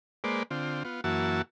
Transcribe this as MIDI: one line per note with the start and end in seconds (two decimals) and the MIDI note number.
0.24 0.43 56
0.24 0.43 58
0.24 0.43 71
0.24 0.43 72
0.24 0.43 74
0.51 0.83 50
0.51 0.83 60
0.51 0.83 65
0.85 1.01 59
0.85 1.01 65
1.04 1.42 42
1.04 1.42 52
1.04 1.42 58
1.04 1.42 66
1.04 1.42 81
1.04 1.42 88